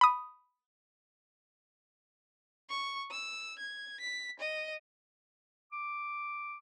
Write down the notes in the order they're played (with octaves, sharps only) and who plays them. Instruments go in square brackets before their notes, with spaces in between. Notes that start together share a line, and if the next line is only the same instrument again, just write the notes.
[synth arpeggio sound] B5 D#6
[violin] C#6
E6
G#6
B6
D#5
[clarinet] D6